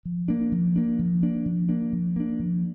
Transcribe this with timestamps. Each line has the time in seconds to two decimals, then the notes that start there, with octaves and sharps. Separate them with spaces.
0.05 F3
0.28 A#3 D4
0.52 F3
0.76 A#3 D4
0.99 F3
1.23 A#3 D4
1.46 F3
1.69 A#3 D4
1.93 F3
2.16 A#3 D4
2.39 F3